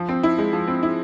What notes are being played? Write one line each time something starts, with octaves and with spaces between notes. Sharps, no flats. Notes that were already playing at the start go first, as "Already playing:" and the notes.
Already playing: F3
C4
E4
G#3
F3
C4
E4